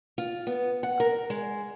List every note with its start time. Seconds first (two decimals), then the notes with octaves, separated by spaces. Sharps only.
0.18 F4
0.47 B3
0.83 F#5
1.00 A#4
1.30 G#3